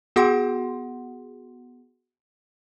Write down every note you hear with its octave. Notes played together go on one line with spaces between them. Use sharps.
B3 F#4 G#4 F#5 C6